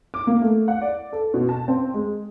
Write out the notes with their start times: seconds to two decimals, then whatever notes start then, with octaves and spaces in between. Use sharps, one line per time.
0.14 D6
0.27 A#3
0.42 A3
0.68 F#5
0.81 D5
1.13 A4
1.34 B2
1.49 A5
1.68 C4
1.94 G#3